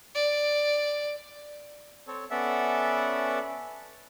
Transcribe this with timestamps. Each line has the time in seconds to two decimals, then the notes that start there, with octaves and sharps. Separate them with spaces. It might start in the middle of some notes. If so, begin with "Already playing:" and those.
0.15 D5
2.07 C4 A4 C#5
2.31 B3 C#4 A4 D5 E5 F#5